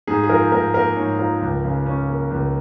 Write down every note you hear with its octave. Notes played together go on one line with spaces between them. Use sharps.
G#2 G#4
G#4
F3 A#4
G#2 A#4
A#3 A#4
G#2 C#5
F3 A#4
C#2
C#3
C#4
A#3
C#2